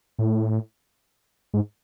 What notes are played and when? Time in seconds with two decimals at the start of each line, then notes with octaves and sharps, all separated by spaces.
0.18 A2
1.54 G#2